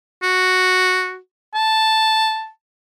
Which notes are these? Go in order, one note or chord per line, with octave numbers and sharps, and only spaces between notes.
F#4
A5